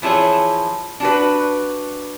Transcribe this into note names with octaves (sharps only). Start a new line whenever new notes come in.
E3 F3 E4 G#4 C#5
D4 F#4 B4